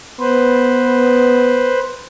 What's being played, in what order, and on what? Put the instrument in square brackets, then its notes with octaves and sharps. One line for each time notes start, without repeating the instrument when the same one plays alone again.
[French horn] B3 [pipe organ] B4 C5